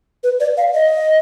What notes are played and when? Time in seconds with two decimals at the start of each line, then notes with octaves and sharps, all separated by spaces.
0.23 B4
0.40 D5
0.57 F5
0.74 D#5